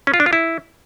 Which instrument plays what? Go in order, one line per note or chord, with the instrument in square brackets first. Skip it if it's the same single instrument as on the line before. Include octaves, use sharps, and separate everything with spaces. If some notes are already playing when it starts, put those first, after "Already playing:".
[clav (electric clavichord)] C#4
F4
D4
F4
E4